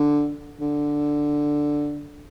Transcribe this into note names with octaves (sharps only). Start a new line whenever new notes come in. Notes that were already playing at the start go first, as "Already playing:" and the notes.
Already playing: D3
D3